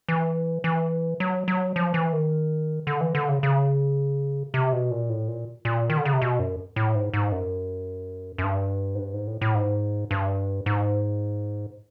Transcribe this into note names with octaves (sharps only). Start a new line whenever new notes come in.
E3
E3
F#3
F#3
F3
E3
D#3
D3
E3
D3
C#3
C#3
C3
B2
A#2
A2
A#2
A#2
D#3
D3
C#3
C3
B2
F#2
A2
G#2
G#2
F#2
F#2
G2
G#2
G2
G#2
A2
A2
G#2
G2
G#2